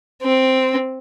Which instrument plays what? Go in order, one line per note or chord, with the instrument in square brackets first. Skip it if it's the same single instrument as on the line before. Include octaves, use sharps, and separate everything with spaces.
[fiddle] C4